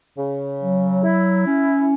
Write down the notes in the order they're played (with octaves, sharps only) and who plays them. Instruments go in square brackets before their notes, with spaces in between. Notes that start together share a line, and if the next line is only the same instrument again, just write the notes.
[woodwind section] C#3
F#3
E4
C#4